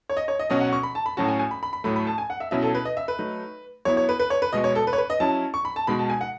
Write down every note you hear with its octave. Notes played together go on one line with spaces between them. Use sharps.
C#5
D#5
C#5
D#5
B2 F#3 C#4 F#4 D#5
F#5
C#6
B5
A5
B5
A2 F#3 C#4 F#4 A5
G#5
G#5
B5
B5
B5
A2 F#3 A3 B5
B5
A5
G#5
F#5
E5
B2 F#3 C#4 E4 E5
A4
B4
D#5
E5
B4
F#3 A3 D#4
F#3 B3 E4 C#5
C#5
B4
B4
C#5
B4
B2 G#3 B3 F#4 D#5
C#5
A4
B4
C#5
B4
D#5
F#3 C#4 E4 A5
C#6
B5
A5
B2 G#3 D#4 F#4 B5
A5
G#5
F#5